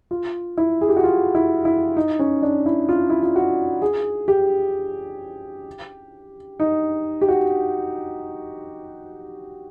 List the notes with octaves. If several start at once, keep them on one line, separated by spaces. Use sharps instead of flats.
F4
E4
G#4
G4
F#4
F4
E4
E4
D#4
C#4
D4
E4
F4
E4
F4
F#4
G#4
G4
D#4
G4
F#4